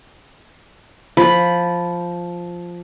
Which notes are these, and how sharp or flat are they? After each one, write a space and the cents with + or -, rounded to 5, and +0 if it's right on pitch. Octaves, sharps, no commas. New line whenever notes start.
F3 +0 B5 +0